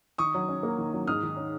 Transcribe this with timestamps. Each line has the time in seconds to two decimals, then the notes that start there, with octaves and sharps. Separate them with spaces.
0.18 D#3 C#6 D#6
0.34 F#3
0.49 C#4
0.63 A#3
0.78 D#3
0.94 F#3
1.07 G#2 D#6 F6
1.23 D#3
1.37 C#4